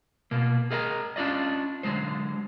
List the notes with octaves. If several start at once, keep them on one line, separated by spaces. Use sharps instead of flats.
B2 A#3
G#4 A#4 D#5 F#5 A#5
C#4 D4 F4 D5 D#5
D3 F#3 G#3 C5